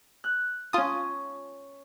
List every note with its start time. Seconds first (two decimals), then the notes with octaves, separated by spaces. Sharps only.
0.24 F#6
0.73 C#4 F4 A5 D#6